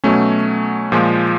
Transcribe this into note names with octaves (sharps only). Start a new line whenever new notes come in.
B2 F#3 A3 C#4
A#2 F3 G#3